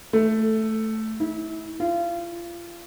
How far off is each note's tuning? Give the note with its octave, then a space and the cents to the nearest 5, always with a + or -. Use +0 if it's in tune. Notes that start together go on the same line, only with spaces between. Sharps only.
A3 +0
E4 -30
F4 -30